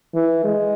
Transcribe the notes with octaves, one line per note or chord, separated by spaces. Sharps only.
E3
G#3